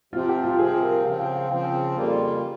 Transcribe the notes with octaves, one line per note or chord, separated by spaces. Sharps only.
C3 F3 C4 F4
G4
F4
C3 F3 C4 G#4
A#4
C#3 F3 C4 F5
G5
F5
C#3 F3 C4 G5
F2 C#3 G3 A#3 F4